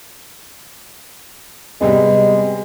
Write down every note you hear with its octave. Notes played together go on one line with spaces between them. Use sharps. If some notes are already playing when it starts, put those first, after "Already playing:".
C3 G3 G#3 B3